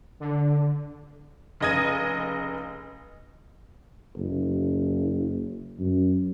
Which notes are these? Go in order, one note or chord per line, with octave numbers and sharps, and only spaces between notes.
D3
F1 C#3 D#5 G#6 D#7
F#1
F#2